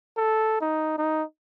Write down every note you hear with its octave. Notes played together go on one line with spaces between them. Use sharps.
A4
D#4
D#4